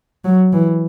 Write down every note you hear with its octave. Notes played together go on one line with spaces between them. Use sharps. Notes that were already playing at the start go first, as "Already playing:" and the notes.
F#3
E3